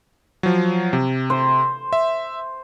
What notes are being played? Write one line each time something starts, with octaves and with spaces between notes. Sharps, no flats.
F3 F#3
C3
C5
E5